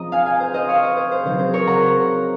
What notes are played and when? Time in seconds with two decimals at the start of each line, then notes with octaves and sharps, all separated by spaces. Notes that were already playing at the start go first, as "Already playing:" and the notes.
Already playing: C#3 F3 C4 D#5 A#5
0.12 F5 G#5
0.26 F5 G#5
0.40 C5
0.54 C5 D#5
0.69 C#5 F5
0.82 C5 D#5
0.96 C5
1.11 C5
1.25 C#3 F#3 C4 D#4 C5
1.39 C5
1.53 A#4 C#5
1.67 F#5 A#5